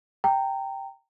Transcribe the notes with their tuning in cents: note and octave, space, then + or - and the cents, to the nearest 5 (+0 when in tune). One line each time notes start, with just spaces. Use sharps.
G5 +0 A#5 -25